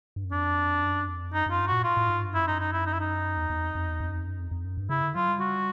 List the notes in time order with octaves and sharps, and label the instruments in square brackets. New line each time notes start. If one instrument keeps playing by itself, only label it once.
[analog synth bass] G2
F#2
[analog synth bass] F2 [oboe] D4
[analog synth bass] F#2
F2
[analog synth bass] F#2 [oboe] D#4
[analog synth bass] F#2 [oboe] F4
[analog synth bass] G2
[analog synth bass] A#2 [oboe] F#4
[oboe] F4
[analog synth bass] A2
G#2
G2
[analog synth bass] F#2 [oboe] E4
[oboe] D#4
D#4
E4
D#4
E4
D#4
[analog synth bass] E2
E2
F2
F2
E2
F2
F#2
F2
F#2
F2
F2
F#2
G2
[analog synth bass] C#3 [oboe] E4
[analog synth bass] D3
[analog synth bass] F#3 [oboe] F4
[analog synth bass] G3
[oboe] F#4